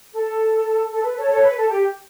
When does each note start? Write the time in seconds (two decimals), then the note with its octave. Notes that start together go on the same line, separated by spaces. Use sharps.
0.13 A4
0.91 A4
1.04 B4
1.17 A4 C#5
1.30 A4 C#5
1.43 B4
1.57 A4
1.70 G4